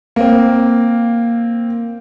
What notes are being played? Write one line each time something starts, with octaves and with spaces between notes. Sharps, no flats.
A#3 C4